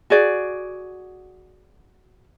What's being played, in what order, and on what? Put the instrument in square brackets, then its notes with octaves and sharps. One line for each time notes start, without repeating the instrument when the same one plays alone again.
[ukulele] F#4 G#4 D5